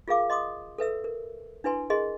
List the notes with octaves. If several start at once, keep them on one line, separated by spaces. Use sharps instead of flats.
F4 G#4 A#4 F5 D6
D#5 C6 D6 D#6
A4 B4 E5 E6
A#4
D4 E4 B4 G#5 C6
G#4 A#4 D#5 C6